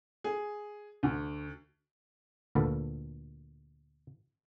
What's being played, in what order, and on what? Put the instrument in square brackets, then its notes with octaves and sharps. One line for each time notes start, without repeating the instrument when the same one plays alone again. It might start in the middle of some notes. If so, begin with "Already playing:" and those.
[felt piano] G#4
D2
[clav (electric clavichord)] D2 A#2 A4 B4 F#5 A5